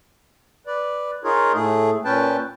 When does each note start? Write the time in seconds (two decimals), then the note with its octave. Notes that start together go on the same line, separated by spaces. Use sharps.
0.67 B4 D5
1.24 D#4 F4 G#4 A#4 C#5
1.54 A2 A3 G#4
2.05 A#2 C#4 B4 G5 A5